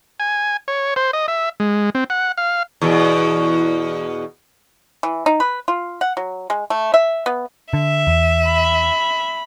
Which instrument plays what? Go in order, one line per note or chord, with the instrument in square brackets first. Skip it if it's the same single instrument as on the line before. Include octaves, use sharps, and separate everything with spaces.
[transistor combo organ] G#5
C#5
C5
D#5
E5
G#3
C4
F#5
F5
[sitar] E2 B2
[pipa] E3
D#4
B4
F4
F#5
F#3
G#3
A3
E5
B3
[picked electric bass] D3 [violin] E5
[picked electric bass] E2
[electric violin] B5